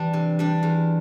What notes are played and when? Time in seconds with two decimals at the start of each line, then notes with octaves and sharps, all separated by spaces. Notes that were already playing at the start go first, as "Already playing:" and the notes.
Already playing: E3 G3 D4
0.13 C3
0.39 G3 D4
0.63 E2